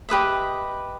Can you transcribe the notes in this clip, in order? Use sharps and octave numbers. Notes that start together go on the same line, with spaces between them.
G4 B4 D#5 E5